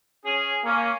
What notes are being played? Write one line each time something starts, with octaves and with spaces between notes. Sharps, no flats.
C#4 G#4
A#3 C#4